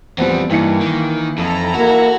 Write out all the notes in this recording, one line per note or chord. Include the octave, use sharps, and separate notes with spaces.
E2 F3 G3 B3 C4
G2 E3 A#3 D#4 C#7
D#3
F2 E4 A4 A#5
A#3 F#4 A#4